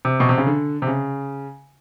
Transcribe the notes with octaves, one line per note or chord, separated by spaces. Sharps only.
C3
B2
C3
C#3
D3
C3
C#3